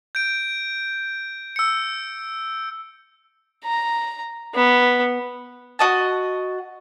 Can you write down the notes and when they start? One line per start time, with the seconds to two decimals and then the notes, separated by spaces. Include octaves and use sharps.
0.15 G6 D7
1.56 E6 C#7
3.64 A#5
4.55 B3
5.79 F#4 D#5 A5